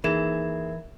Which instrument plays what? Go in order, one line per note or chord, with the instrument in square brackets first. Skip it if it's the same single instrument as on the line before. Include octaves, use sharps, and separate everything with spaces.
[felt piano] D#2 G#4 E7 [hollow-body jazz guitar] E3 [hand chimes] A#4 E5 G#6